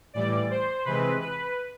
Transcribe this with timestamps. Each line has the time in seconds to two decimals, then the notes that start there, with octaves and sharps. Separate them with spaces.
0.14 A2 E3 G3 D5
0.50 C5
0.85 C3 E3 G#3 C4 B4
1.21 B4